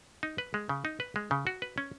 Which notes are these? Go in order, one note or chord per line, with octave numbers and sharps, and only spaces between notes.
D#4
B4
G#3
C#3
D#4
B4
G#3
C#3
F#4
B4
C#4